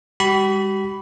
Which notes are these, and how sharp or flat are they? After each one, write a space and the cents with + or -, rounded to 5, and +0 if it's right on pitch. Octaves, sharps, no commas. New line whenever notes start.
G3 +45 G4 -45 B5 +0